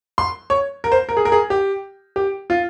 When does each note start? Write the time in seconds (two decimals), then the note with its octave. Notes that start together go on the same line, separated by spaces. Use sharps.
0.18 C6
0.50 C#5
0.84 A#4
0.92 C5
1.09 A#4
1.17 G#4
1.25 A#4
1.32 G#4
1.50 G4
2.16 G4
2.50 F4